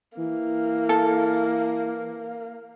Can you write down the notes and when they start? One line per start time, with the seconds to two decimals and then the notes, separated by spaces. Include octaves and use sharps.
0.18 E3 A#3
0.89 A4